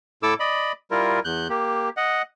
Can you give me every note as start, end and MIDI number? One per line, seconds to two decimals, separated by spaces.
0.23 0.34 45
0.23 0.34 64
0.23 0.34 69
0.23 0.34 86
0.23 0.34 88
0.40 0.72 74
0.40 0.72 75
0.40 0.72 83
0.91 1.20 55
0.91 1.20 64
0.91 1.20 65
0.91 1.20 70
1.25 1.48 40
1.25 1.48 90
1.25 1.48 91
1.49 1.89 58
1.49 1.89 67
1.97 2.22 75
1.97 2.22 78